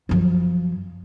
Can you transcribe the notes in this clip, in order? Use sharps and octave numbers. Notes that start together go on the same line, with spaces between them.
F#2 F3